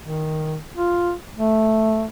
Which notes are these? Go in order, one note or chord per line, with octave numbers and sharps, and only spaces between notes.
D#3
F4
A3